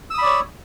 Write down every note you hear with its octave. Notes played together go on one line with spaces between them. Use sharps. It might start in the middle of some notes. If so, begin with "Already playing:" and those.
C#5 D5 B5 D#6 E6